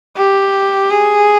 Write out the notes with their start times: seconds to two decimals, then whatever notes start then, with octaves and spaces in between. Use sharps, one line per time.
0.17 G4
0.90 G#4